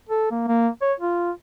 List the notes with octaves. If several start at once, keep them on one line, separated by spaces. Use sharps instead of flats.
A4
A#3
A#3
C#5
F4